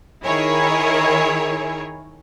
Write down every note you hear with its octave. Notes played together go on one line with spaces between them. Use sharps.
D#3 E4 G#4 A#4 C#5